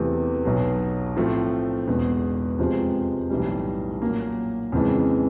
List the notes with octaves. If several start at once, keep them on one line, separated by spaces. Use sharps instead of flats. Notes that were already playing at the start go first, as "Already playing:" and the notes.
Already playing: E2 C3 E3 A3
B1 B2 F#3
A2 F3 A3 C4
E1 E2 B2
F2 C3 F3 G#3
B1 A2 E3 G3
A#2 F#3 A#3
F2 C#3 E3 G#3